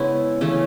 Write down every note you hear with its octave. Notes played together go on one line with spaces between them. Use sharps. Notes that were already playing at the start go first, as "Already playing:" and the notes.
Already playing: C#3 G#3 B3 C#4 E4
C#3 E3 A3